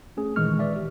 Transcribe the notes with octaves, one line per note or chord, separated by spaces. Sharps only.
A3 C#4 G#4
A#2 D#3 E3 G#3 C#6 F6
B4 D5 E5
G4